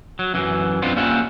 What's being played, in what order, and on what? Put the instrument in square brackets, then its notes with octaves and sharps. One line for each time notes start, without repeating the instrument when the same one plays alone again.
[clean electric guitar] F#3
F#2 E3
B3 C4 D4 F4
G3 A#3 C#4 F4 E5 F#5